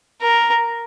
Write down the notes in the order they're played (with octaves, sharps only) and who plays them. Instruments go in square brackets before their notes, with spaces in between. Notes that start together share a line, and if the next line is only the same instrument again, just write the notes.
[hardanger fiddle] A#4